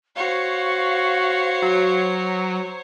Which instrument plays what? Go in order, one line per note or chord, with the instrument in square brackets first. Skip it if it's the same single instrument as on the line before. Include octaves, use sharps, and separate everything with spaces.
[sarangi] F#4 [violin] C5 C#5 [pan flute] F5
[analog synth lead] F#3